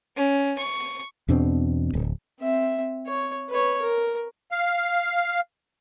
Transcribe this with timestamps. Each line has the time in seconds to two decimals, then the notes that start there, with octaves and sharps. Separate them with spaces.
0.16 C#4
0.58 C#6
1.28 E2 B2 C4 D4
1.93 D1
2.40 C4 E5
3.07 C#5
3.49 B4 C#5
3.82 A#4
4.51 F5